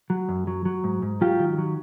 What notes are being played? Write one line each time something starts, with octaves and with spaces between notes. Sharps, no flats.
F#3
F#2
F#3
F#3
G#2
G#2
F#3 F4 G4
D#3
F#3